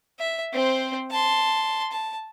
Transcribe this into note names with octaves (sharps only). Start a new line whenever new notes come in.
E5
C4 C5
A5 C6
A5